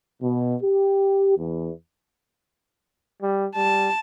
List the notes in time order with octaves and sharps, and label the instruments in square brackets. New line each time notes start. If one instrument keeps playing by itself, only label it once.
[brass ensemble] B2
G4
E2
[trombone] G3
[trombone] G3 [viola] A5